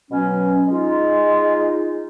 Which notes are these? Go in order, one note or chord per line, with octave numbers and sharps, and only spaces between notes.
B2 F#3 C#4
G#3 D#4 F4